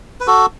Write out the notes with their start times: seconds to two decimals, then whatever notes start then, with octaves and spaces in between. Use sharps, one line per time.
0.20 B4
0.27 F#4 A4